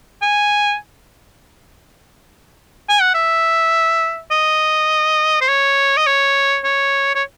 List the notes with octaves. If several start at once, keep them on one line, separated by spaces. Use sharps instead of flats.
G#5
G#5
F#5
E5
D#5
C5
C#5
D#5
C#5
C#5
C#5